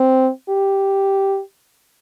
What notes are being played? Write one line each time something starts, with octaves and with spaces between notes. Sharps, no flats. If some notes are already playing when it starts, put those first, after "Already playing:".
Already playing: C4
G4